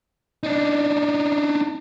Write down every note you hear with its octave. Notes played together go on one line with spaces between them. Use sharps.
D4 D#4